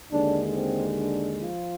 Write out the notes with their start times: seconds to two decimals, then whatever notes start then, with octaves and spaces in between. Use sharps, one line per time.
0.10 D#2 D3 G#3 D4
0.54 C4
0.97 D4
1.41 F3 F4